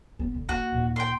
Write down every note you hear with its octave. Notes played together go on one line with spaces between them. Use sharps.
B3
D3
A#3 F#4
D#2 A#2
G5 C6